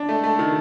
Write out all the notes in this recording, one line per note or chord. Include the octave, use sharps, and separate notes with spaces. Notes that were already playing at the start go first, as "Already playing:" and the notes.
Already playing: D4
A3
A3
D#3